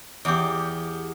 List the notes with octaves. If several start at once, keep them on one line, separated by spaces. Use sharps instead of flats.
E2 G4